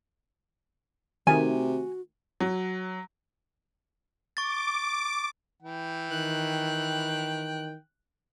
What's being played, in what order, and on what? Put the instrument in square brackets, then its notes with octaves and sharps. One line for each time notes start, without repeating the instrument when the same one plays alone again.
[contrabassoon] C3 [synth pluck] D#3 A3 D#4 [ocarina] F#4 [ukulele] G#5
[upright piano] F#3
[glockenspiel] C#6 A6 [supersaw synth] D6
[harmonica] E3 G5
[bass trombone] D#3 [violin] F#6